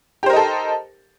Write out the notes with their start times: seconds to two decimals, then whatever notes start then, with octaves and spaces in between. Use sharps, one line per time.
0.23 G4
0.26 C5
0.30 A#4
0.33 D#4
0.36 A4